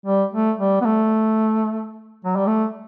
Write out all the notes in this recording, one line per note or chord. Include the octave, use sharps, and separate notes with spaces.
G3
A3
G3
B3
A3
F#3
G3
A3